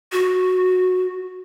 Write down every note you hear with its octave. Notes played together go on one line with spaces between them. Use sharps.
F#4